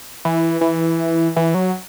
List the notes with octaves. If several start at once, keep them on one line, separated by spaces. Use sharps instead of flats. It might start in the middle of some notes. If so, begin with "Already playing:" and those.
E3
E3
E3
F#3